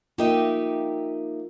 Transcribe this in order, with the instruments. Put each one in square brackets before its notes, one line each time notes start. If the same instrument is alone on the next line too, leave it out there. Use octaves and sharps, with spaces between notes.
[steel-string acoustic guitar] A#3 D#4 E5 [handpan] F4 [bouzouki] G4